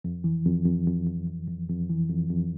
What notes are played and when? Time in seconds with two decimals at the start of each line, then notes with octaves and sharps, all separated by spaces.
0.04 F2
0.24 E3
0.45 F2
0.66 F2
0.86 F2
1.07 F2
1.28 F2
1.48 F2
1.69 F2
1.89 E3
2.10 F2
2.30 F2